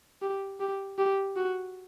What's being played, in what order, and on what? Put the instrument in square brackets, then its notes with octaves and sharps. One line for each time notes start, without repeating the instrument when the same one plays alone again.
[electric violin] G4
G4
G4
F#4